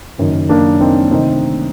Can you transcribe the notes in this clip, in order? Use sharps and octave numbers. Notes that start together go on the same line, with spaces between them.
F#1 F#2 D#3
A#3 D4
C4 D#4
D2 C3 D#3 C4 D#4